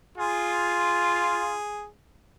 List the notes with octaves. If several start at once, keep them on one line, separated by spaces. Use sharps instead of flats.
F4 G#4